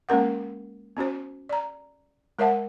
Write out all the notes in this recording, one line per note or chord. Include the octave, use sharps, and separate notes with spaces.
G#3 A#3 C#4 A#4 F#5
B3 C#4 F#4 C5
D5 A#5
G#3 A#4 C#5 E5 F#5 A5